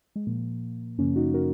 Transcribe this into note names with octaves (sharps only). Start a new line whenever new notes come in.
G#3
A#2 F3 A#3
F#2 C#3 F3 A#3 C#4
D#4 F#4
F#4 A#4